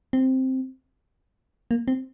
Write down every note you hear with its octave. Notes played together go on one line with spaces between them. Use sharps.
C4
A#3
C4